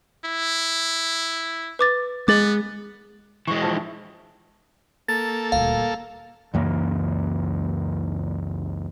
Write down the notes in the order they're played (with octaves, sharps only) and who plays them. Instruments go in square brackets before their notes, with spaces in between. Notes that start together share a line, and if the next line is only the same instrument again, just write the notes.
[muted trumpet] E4
[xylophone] B4 D6 A6
[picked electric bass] G#3 [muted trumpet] B3 [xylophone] D6 A6 F#7
[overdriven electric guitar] E3 G#3 [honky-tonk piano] C#6
[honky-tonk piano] F3 A5
E4
[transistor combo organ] A#3 A4 [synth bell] A6
[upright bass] D#1 D2 [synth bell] F5
[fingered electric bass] C#2 F#2 E3 A#3